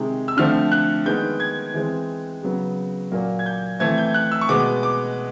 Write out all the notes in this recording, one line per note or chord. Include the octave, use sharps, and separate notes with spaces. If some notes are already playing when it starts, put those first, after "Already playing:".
Already playing: C3 D#3 G#3
E6
D3 F3 A3 C4 F6
F#6
D#3 G#3 B3 G6
G#6
E3 G#3 C4
C#3 F#3 B3
A#2 F#3 A#3
G#6
G6
E3 A3 C4 G#6
G6
F#6
E6
C#6
B2 G#3 B3 D6
D6